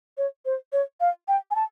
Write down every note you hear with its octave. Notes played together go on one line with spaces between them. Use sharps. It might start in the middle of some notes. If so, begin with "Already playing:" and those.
C#5
C5
C#5
F5
G5
G#5
A5